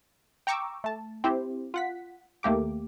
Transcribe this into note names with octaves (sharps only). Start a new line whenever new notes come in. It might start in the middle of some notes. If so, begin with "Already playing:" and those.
G5 A#5 C#6 D6 E6
A3 A5
C4 E4 G4 C5
F4 F#5 B6
D#2 A3 A#3 G4 D6